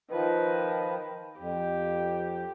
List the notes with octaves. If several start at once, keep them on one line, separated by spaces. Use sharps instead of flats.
D#3 F3 B4
F2 G4